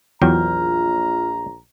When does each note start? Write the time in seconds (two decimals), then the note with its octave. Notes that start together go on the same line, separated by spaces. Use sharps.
0.22 A#1 E2 F#3 F4 G5 A#5